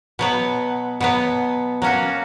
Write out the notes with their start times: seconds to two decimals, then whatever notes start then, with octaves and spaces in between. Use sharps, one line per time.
0.19 B2 F#3 B3
1.01 B2 F#3 B3
1.82 F#3 A#3 C#4 F#4